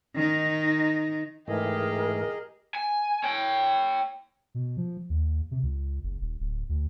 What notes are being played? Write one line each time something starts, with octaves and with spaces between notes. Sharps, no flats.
D#3 D#4
G#2 E3 A3 G4 G#4 A#4 D#5
G#5
C#5 G5
B2
F3
D#2
C3
C#2
F#1
D#1
D1
D2